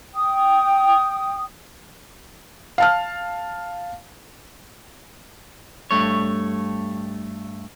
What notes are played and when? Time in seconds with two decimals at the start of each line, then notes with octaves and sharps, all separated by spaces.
0.14 G5 D#6
2.78 F5 A5 F6
5.91 G2 A3 C#5